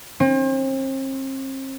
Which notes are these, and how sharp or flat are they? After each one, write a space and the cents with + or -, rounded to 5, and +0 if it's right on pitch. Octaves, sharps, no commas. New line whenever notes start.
C4 +40